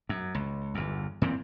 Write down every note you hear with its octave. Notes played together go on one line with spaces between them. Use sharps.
F#2
C#2
G1 E2
A#2 E3 C4